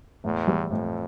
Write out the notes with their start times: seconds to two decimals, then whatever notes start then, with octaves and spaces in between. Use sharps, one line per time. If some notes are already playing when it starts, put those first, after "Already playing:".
0.24 E2 A2
0.47 E3 G3
0.71 F2 A2